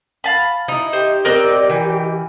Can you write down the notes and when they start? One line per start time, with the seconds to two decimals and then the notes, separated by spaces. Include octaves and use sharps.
0.24 F5 A5 B5
0.68 D#4 E4
0.93 G4 C5
1.25 C4 A#4 D5 D#5 F#6
1.69 E3